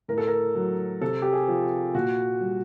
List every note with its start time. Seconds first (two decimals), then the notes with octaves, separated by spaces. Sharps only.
0.08 A2 A#4
0.18 A4
0.27 A#4
0.55 F#3
1.01 C3 A4
1.22 G4
1.33 G#4
1.48 F3
1.95 A#2 F#4
2.41 G3